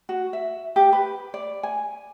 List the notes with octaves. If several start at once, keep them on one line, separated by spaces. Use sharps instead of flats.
F#4
E5
G4
B4
D5
G#5